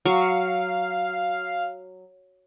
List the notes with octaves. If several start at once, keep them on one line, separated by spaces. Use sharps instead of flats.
F#3 F5 C#6